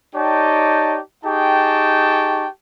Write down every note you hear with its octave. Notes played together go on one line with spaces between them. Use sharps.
D#4 G4 C#5 D5 G5 A5
D#4 G4 G#4 G5 A5 C#6